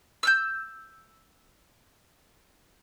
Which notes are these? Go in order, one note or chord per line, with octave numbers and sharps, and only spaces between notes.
E6 F6 G6